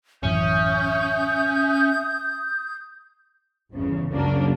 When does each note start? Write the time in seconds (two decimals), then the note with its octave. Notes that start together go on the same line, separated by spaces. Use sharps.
0.23 A1 F#2 E3 C#4 E5 D#6 G6
3.73 G1 E2 C#3
4.10 C#2 F#2 C#3 F#3 A#3 D4